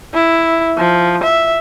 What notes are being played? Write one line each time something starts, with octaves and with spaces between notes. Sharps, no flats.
E4
F3
E5